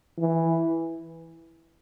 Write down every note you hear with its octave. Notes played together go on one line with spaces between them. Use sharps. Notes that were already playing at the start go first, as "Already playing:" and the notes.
E3